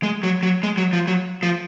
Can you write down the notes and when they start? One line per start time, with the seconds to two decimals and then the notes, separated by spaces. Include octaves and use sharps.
0.03 G#3
0.23 F#3
0.43 F#3
0.63 G#3
0.78 F#3
0.93 F3
1.07 F#3
1.43 F3